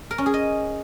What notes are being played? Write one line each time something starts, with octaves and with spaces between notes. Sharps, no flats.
A#4
C#4
G#4
D#5